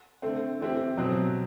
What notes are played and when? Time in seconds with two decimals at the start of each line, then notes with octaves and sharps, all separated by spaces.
0.22 D3 A3 C4
0.60 E3 A3 C4 E4 G4
0.97 B2 F#3 C4